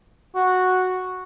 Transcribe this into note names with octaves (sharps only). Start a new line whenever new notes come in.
F#4